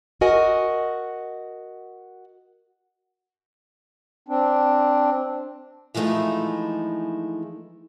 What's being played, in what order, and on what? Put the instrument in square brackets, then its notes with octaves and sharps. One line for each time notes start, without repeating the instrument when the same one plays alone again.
[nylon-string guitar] F#4 A#4 D#5 F#5 G#5
[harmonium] C4 D4
[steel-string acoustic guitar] E3 F3 G#3 A3 D#4 E4